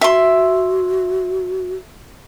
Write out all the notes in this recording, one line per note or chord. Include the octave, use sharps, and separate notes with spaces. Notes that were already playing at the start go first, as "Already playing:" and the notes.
F#4 E5 C6